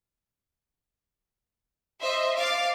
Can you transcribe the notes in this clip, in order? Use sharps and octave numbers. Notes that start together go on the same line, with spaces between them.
C5 D#5 E5
F5 D6 A6